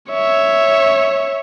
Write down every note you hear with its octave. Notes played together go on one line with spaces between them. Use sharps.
C#5 E5